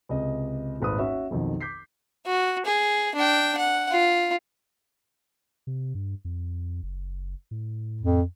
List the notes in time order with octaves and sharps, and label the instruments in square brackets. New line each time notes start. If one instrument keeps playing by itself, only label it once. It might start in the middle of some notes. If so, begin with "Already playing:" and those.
[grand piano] C#2 C3 D#5
D#1 G#1 B4 D#6
C#4 F#4 E5
B1 F2 D#3
D6 G6 B6 C7
[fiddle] F#4
G#4
D4 G5
F#5
F4
[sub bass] C3
G2
F2
F#1
A2
[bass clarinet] F2